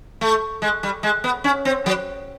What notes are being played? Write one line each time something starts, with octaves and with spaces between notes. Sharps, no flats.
A3
G#3
G3
G#3
B3
C#4
C4
F#3